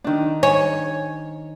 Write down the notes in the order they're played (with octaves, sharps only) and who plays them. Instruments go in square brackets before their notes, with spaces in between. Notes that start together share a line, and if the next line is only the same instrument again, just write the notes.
[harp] D#3 D4
[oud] C#5 [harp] G#5